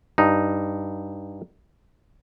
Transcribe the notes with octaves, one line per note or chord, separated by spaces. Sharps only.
G2 D#4